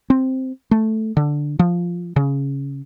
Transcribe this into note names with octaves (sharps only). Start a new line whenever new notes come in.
C4
A3
D3
F3
C#3